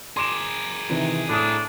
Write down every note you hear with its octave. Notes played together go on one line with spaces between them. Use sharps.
G#4 A#4 C6 D6 E7
C3 D#3 E3
A2 D4 D#6